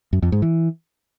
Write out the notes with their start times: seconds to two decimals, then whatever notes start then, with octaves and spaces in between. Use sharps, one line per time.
0.13 F#2
0.22 F2
0.32 G#2
0.42 E3